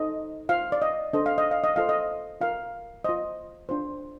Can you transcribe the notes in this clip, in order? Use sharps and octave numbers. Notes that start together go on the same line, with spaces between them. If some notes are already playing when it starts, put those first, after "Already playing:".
Already playing: D#4 A4 C5 D#5
F4 C5 F5
D5
D#5
D4 A4 C5 D#5
F5
D#5
F5
D#5
F4 A4 C5 F5
D#5
F4 A#4 F5
F4 C5 D#5
D4 F4 C5